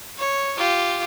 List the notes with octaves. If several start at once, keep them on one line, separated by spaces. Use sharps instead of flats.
C#5
F4 G4